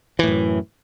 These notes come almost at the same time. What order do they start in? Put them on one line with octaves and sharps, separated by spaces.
E3 A2 F#2